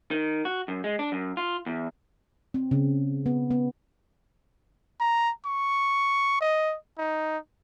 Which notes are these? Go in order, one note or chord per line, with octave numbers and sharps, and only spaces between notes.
D#3
F#4
F#2
G#3
D4
F#2
F4
E2
C4
C#3
B3
B3
A#5
C#6
D#5
D#4